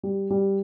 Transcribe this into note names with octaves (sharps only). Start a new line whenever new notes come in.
G3
G3